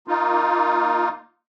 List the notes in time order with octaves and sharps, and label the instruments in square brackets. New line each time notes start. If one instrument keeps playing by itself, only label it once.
[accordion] A#3 D#4 F4